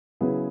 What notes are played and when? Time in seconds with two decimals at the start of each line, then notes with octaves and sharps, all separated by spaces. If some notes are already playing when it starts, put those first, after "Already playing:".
0.21 C#3 F#3 B3 E4 G#4